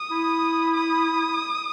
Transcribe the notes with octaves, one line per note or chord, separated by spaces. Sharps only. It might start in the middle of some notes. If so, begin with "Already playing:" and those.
Already playing: D#6
E4
D#6